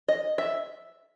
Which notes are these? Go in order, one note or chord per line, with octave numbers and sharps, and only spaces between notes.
D#5
E5